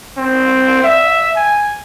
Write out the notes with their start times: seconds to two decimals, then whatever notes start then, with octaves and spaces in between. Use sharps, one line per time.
0.17 C4
0.83 E5
1.36 G#5